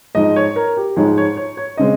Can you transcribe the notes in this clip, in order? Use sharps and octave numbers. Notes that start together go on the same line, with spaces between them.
G#2 F3 G#3 D#5
C#5
A#4
G4
G#2 F3 G#3 C#5
C#5
C#5
C#5
C#3 G#3 C4 D#5